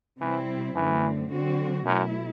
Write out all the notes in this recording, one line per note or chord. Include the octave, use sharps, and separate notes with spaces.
C3 E3 G3 C4 E4
F#2 D3 E3 A3 C4
D3 F#3 C4 F#4
F#2 B2 F#3 A3 E4